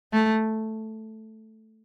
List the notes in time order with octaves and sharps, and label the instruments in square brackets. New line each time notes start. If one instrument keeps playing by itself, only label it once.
[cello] A3